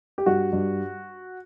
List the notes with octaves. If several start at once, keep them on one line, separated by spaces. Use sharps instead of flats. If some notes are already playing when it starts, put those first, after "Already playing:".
G4
G2 F#4
G2